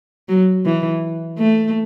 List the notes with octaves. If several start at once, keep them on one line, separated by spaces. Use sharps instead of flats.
F#3
E3
A3